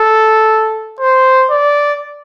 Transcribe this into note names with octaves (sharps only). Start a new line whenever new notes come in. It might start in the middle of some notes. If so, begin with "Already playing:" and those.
Already playing: A4
C5
D5